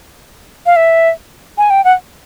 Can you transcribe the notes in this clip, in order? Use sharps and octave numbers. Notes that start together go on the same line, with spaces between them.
F5
E5
G#5
G5
F#5